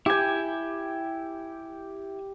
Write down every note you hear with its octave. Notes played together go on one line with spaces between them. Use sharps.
E4 G4 G5 G#5